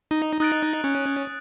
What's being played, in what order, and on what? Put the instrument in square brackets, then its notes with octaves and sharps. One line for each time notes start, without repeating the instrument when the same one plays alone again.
[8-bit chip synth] D#4
[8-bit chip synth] D#4 [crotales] D#6 F#6 A6 D7
[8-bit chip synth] C#4